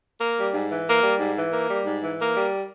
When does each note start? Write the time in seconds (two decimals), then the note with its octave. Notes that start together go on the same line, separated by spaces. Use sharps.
0.21 A#3
0.37 G3
0.54 G#2
0.71 E3
0.87 A#3
1.03 G3
1.20 G#2
1.36 E3
1.53 A#3
1.70 G3
1.86 G#2
2.02 E3
2.19 A#3
2.35 G3